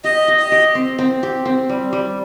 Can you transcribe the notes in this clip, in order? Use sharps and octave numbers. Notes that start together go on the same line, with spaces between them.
G4 D#5
G4
D#5
G4
C4
C4
G4
C4
G3
G3